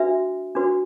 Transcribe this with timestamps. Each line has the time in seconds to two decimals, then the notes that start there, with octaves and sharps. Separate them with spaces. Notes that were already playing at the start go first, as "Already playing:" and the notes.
Already playing: D4 F#4 B4 E5
0.55 D4 F#4 B4